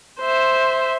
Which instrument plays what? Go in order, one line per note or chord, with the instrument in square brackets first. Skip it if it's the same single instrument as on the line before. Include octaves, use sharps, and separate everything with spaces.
[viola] C5 E5